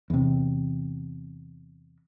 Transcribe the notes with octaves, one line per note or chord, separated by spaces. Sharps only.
E2 C3